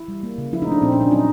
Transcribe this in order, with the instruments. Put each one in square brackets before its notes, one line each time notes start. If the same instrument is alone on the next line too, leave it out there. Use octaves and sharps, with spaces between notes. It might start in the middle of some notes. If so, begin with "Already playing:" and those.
Already playing: [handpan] E4
G3
A#3
C#3
F3 E4
D#4
A3 D4
A#2 C4
C#4
A#2 D4
F#3 D#4